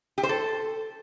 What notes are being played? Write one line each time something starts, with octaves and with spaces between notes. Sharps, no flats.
G4
C5
A4